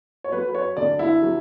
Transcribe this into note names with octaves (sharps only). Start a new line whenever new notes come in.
C#5
F#3 B4
B4
C#5
D2 D5
E4
F#3